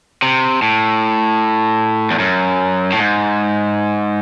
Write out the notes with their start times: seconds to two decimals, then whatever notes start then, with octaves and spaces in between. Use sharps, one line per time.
0.22 C3
0.62 A2
2.11 E2
2.19 F#2
2.92 A2
2.98 G#2